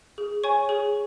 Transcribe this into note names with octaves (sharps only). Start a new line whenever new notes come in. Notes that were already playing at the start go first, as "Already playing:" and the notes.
G#4
C#5 G#5 C#6
G#4